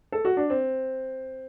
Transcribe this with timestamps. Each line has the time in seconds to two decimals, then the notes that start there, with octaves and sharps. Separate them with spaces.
0.12 A4
0.25 F#4
0.37 D4
0.50 C4